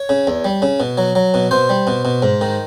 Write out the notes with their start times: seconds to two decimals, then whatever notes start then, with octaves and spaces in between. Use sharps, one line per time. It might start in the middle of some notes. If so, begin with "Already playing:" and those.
Already playing: C#5
0.09 C#3
0.27 E2
0.45 G3
0.62 C#3
0.80 B2
0.98 F#3
1.15 F#3
1.34 B2
1.51 B2 C5
1.69 G3
1.87 B2
2.05 B2
2.22 G#2
2.41 D#3